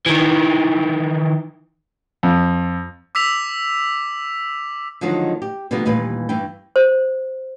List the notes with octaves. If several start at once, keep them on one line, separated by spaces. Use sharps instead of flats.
D#3 E3
F2
D6 E6 B6 F7
D3 D#3 F3 F#3 G#3 D#4
G4
B2 D3 F3 G3 A#3 B3
D#2 A#2 E3 G3 F4 B4
G2 E3 E4 G5
C5